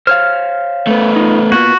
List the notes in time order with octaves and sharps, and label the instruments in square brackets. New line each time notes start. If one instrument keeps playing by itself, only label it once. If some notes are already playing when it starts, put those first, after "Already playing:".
[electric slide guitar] C5 C#5 F5 [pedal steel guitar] F6
[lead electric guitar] A3 B3
[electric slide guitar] D#4 F4
[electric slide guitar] A#3 B3 F4 [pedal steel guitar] F#4